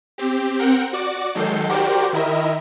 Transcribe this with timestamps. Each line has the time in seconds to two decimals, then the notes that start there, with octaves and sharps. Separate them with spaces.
0.18 C4 G4
0.59 C4 A#4 F#5 G5
0.93 F#4 D5 D6
1.35 D#3 F#3 G#3 A4 G6 C7
1.69 F#4 G4 A#4 C5 D5 G5
2.13 D#3 E4 A#4 D#5 E5